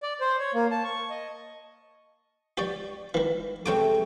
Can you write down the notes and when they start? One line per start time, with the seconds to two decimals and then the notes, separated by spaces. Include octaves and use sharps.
0.03 D5
0.20 C5
0.39 C#5
0.54 A#3
0.71 A5
0.84 C#6
1.10 D#5
2.57 G4 C#5 D5
3.14 D#3 E3
3.66 C3 G#3 A3 A4 C#5 G5 D6